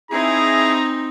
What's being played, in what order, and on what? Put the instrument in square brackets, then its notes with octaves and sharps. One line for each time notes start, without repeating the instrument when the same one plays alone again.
[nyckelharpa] C4 D#4 [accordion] E4 G#4 [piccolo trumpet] A#5